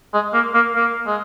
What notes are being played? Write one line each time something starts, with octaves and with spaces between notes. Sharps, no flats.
G#3
A#3
A#3
A#3
G#3